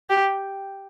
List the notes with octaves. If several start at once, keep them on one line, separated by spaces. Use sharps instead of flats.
G4